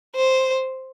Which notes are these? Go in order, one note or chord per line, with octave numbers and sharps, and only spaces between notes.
C5